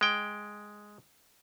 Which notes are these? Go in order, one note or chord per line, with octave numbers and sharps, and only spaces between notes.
G#3 G5